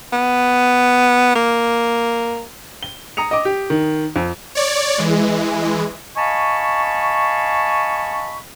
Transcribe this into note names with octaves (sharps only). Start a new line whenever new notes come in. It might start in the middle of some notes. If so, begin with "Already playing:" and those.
B3
A#3
G7
A#5 D#6 C#7 F7
D#5 D6
G4
D#3
F2
C#5 D5
E3 G#3
D#5 F5 G#5 A5 B5 C#6